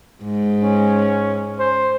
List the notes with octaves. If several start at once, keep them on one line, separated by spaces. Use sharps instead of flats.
G#2
C#4
C5